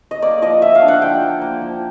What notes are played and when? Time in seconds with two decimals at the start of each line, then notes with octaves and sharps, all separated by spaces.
0.11 D#5
0.22 A#3 D5
0.42 F3 D#5
0.62 F3 E5
0.75 F5
0.82 D4
0.88 F#5
1.02 F3 G5
1.22 A#3
1.42 A#3
1.62 F3